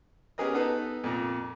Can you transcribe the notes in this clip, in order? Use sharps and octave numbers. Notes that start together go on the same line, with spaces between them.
B3 C#4 G4 G#4 A#4 D#5
B3 D#4 A4 B4
F2 A#2 A#5